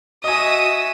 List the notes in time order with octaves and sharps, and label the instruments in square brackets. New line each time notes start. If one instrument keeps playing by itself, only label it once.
[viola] F#4 [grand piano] D#5 G#5 [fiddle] E5 [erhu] D#6